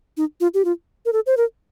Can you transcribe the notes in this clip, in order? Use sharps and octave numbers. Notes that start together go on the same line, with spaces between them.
D#4
F4
G4
F4
A#4
A4
C5
A#4